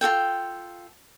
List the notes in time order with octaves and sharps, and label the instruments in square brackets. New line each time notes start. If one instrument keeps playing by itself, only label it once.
[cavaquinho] F4 F#4 A4 G5